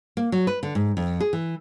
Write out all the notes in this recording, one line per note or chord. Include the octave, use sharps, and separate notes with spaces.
A#3
F#3
B4
D3
G#2
F2
G#4
E3